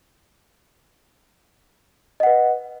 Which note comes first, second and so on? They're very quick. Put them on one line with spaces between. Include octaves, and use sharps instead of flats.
D#5 F#5 B4